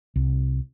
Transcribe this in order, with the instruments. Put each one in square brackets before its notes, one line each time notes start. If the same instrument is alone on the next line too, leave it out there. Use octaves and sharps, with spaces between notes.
[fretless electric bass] C2